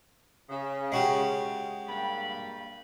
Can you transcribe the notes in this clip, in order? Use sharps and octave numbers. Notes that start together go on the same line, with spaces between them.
C#3
G#3 F#4 G4
G2 A#3 B5